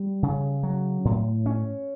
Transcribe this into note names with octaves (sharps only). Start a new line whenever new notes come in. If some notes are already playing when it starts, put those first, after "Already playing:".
Already playing: G3
C#3
F#3
A2
C#4